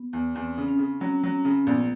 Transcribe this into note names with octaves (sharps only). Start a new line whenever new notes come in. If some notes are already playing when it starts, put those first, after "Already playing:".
Already playing: B3
E2
E2 C4
C#3
C#4
C#3
F#3 C#4
F#3
C#3
A#1 B3
A#3